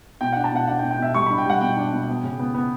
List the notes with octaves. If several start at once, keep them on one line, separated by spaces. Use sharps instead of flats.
B2 G5
D4 F#5
A5
B2 F#5
D4 F#5
G5
B2
G5
B2 E5
G3 C#6
D4 B5
G5
G3 F#5
B2 G5
D4
B2
B3
C#3
B3
B3